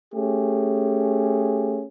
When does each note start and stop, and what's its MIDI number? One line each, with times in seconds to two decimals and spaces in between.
0.14 1.85 57
0.14 1.85 61
0.14 1.85 67
0.14 1.85 68